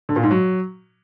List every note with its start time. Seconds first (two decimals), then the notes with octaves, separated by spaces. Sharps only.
0.09 D3
0.16 A#2
0.23 G#2
0.31 F#3